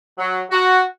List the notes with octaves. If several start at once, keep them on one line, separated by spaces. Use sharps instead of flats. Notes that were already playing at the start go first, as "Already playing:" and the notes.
F#3
F#4